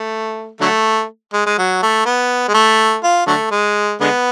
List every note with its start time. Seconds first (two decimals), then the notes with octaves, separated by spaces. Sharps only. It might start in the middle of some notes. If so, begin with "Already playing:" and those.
Already playing: A3
0.61 D3 F#3 A3
1.33 G#3
1.46 G#3
1.58 F#3
1.83 A3
2.06 B3
2.49 G#3
2.54 A3
3.04 F4
3.27 D3 F#3 A3
3.51 G#3
4.01 D3 G#3 B3